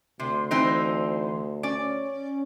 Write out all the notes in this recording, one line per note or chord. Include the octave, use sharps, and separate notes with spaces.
D2 C3 C6
E3 C4 D#4
C#4 D5